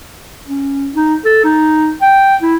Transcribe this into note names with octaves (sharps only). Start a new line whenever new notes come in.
C#4
D#4
A4
D#4
G5
E4